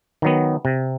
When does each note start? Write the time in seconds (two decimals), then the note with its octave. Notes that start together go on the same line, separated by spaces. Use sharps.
0.22 D#3 F#3 B3
0.65 C3